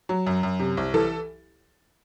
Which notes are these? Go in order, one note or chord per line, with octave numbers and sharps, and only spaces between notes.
F#3
F#2
F#2
C3
C2
E3 A4